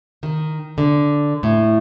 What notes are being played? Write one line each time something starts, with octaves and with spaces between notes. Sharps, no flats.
D#3
D3
A2